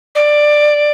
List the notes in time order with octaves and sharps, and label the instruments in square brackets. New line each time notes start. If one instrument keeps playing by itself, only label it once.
[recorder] D5